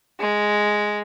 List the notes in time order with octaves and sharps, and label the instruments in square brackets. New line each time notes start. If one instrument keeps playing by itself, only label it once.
[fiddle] G#3